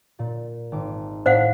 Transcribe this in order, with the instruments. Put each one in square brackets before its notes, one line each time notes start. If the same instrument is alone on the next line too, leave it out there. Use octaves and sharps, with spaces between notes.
[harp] A#2 D5
G#1 D6
[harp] A2 [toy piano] C5 F5 F#5